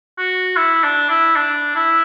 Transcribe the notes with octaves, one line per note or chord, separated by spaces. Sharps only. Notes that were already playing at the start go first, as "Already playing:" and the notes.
F#4
E4
D4
E4
D4
E4